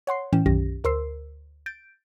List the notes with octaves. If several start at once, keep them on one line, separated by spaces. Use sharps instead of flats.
C#5 F#5 C6 C7
A2 E3 C#4 G5 E7
B1 F#2 D#3 C#4 G4 A#6
D2 A#4 C5 C6 E6 C7
G6 A6 D7